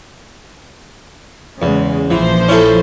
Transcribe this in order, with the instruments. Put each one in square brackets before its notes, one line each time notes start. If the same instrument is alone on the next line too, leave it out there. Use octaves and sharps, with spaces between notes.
[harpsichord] E2 [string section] C#3 G#3
[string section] A#1 F3 C5 [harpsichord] E3
[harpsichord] C#4 E4 A4